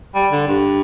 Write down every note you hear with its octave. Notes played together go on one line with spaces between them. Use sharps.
G3
D3
G2